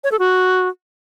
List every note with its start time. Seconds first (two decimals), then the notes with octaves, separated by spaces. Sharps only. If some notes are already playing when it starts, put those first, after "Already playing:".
0.04 C#5
0.12 A4
0.19 F#4